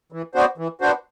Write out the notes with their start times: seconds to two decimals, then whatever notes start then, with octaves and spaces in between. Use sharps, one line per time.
0.12 E3
0.35 B3 D4 F#4 C5
0.58 E3
0.81 B3 D4 F#4 C5